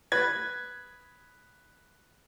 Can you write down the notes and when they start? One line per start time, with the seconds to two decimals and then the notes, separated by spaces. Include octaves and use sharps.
0.12 B4 G#6